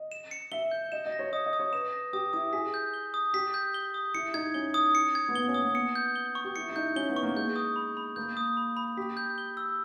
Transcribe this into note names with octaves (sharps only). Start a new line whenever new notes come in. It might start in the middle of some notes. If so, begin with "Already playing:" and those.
Already playing: D#5
E7
C#7
E5 G7
G6
D#5 E7
D#5
A#6
C#5
D#5 D#6
D#5
D#6
C#5
B4 E7
A#6
G4 D#6
E4 D#6
G#4 B6
G6
G7
D#6
G4 B6
G6
G7
D#6
E4 C#7
D#4 G#6
C#4 G7
D#6
C#7
G#6
B3
A#3 G7
C#4
D#6
B3
C#7
G6
G7
C#6
G4
E4 C#7
E4
D#4 G6
C#4 G7
B3
C#6
A#3
G#3 G6
D#6
B5
B5
A#3 G6
D#6
B5
B5
G4 B6
G6
G7
E6